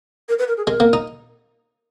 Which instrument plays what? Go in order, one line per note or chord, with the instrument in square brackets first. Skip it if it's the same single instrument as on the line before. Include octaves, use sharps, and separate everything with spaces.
[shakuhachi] A#4
B4
A#4
G#4
[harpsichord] G#3 [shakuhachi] A#4
[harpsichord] A#3
D#4